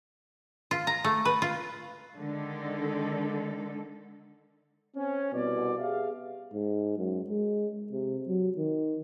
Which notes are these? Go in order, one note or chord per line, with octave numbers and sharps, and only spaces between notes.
F4
A#5
A3
B4
F4
D3 D#3 G#3 A4
C4 C#4
C2 B2 D5
G4 G#4 E5 F5
G#2
F#2
G#3
C3
F#3
D#3